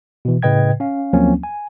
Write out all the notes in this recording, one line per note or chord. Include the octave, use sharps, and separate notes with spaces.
B2 E3
A2 C#3 B4 D#5 G5 G#6
C#4 F5
D2 F3 F#3 A#3 C4 C#4
G#5